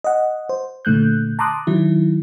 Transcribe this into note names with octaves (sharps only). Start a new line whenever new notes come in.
D#5 F#5
C5
A#2 D3 A3 F#6 G6
A5 A#5 C6 D6 D#6 F#6
D#3 F#3 E4